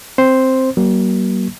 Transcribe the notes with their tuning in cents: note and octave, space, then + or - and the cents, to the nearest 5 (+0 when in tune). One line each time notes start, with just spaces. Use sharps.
C4 +0 C5 +0
F#3 +45 A#3 +25